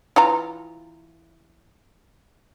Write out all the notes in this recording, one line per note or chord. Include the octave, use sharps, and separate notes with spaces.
E3 F4 A#5